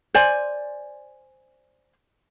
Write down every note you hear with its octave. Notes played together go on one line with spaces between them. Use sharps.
C5 D5 G#5